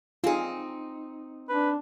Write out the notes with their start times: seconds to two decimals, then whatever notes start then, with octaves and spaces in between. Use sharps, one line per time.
0.24 C4 D#4 F4 G#4
1.49 D4 B4